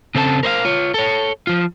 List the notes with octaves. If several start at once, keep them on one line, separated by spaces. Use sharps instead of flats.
C#3 C4 A4 D5 A5
A#4 C5 D#5 F5
F4 C#5
A4 C#5
F3 F4